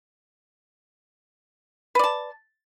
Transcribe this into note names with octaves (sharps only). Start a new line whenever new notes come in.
B4 D5 A5